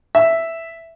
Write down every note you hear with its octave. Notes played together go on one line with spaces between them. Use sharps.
E5